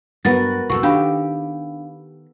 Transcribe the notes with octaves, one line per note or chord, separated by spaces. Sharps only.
G2 F#3 B3 F#4 A#4 A6
C2 F#2 A2 F#4 A4 C#6
D#3 D4 G4 F5 B5